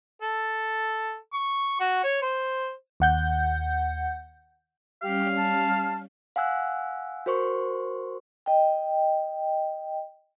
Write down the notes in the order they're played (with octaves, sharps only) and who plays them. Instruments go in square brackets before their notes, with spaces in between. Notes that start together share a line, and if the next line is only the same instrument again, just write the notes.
[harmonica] A4
C#6
F#4
C#5
C5
[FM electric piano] D#2 F#5 G6
[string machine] G3 C#4 [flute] G4 [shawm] F5
[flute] A5
[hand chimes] F5 F#5 G#5 E6 F#6
F#4 A#4 C5 C6 C#6
[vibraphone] D#5 G5